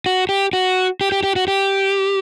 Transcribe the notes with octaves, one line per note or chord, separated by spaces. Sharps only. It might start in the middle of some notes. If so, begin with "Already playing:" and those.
F#4
G4
F#4
G4
G4
G4
F#4
G4